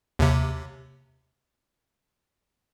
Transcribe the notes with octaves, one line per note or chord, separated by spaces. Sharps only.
D#2 C3